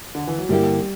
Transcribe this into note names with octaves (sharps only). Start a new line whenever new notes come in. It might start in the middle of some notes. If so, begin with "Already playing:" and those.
D3
E3
F#3
G2 D3 G3 A#3 E4 G4